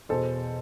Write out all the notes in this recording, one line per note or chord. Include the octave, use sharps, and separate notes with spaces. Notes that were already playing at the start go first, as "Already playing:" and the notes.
E2 B2 A4 C5